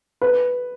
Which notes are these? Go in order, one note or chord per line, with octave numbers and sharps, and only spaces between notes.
B4